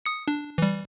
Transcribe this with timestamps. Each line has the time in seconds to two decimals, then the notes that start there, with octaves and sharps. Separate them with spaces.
0.06 D#6 C#7
0.28 D4
0.58 E3 G3